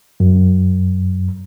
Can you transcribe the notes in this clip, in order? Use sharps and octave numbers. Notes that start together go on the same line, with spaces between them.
F#2